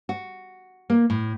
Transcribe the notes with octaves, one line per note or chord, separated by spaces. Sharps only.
F#4
A#3
A2